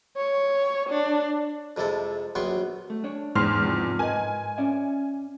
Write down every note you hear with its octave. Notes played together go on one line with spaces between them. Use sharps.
C#5
D4
F2 C3 G#3 E4 A4
A#1 F#3 B3 G5 C6 C#6
A3
D4 C#5
E2 G#2 C6 F6
C3 F3 B3
A#4 B4 D#5 G#5
C#4 D5 E5